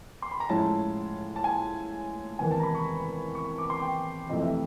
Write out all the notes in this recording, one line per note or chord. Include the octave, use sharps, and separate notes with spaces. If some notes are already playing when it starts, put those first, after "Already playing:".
C6
B5
A#5
A2 F3 G#3 C#4 E4 A5
A5
G#5
E2 C3 D#3 G#5
A5
A#5
B5
C#6
C#6
D6
C6
G5
F2 C3 E3 A3 D#5
E5